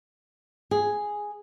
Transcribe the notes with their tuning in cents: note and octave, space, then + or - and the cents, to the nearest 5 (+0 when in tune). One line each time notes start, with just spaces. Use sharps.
G#4 +0